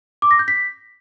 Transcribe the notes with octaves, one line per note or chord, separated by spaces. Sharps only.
D6
A#6
G6
B6